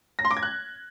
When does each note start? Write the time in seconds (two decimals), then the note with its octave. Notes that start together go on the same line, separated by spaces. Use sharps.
0.19 A#6
0.25 C6
0.31 D6
0.37 G#6
0.43 F#6